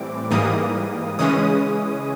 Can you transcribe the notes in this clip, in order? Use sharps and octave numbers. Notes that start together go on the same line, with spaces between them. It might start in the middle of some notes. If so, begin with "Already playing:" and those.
Already playing: A2 E3 G3 C4 D6
G#2 E3 G3 A#3 D#6
C#3 E3 G#3 C#4 D#6